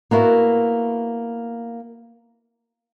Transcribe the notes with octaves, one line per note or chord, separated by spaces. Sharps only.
A#3 B3 E4 F#4